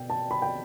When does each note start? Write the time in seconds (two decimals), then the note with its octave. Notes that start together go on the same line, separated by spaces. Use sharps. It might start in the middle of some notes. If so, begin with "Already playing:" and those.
Already playing: B2 G5
0.10 A5
0.31 B5
0.42 G5